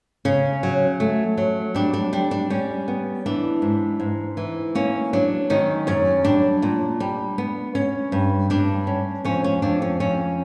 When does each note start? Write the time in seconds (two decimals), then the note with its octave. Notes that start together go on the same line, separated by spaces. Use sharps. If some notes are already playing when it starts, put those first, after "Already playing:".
0.25 C#3 C#4
0.63 F#3
1.00 A3
1.38 F#3
1.75 G3 D4
1.94 D4
2.13 G3 D4
2.31 D4
2.50 G3 C#4
2.88 B3
3.26 E3 D4
3.62 G#2
4.00 G#2
4.37 E3
4.75 A#3 C#4
5.13 F#3 D4
5.50 D#3 C#4 D#4
5.87 F#2 C#4
6.24 G3 D4
6.62 A#2
7.00 G3
7.38 B3
7.75 C#4
8.12 G2
8.50 G2 D4
8.87 C#4
9.25 F2 C#4
9.44 C#4
9.62 F2 D4
9.82 C#4
10.00 F2 C#4